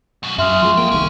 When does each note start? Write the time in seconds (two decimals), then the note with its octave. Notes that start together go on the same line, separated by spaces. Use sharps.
0.23 F#2 B2
0.38 F#2 F#4 G#4 E5 C6 F6
0.62 F3 G#3 C6
0.77 D2 A#3 G5
0.92 D1 C2 D#3 C#4